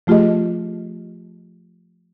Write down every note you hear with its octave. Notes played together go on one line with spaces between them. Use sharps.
F3 A3 F4 G4 G#4 D#5